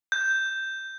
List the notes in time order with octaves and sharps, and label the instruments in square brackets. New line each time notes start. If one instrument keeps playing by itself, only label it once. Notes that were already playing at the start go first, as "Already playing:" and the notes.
[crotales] G6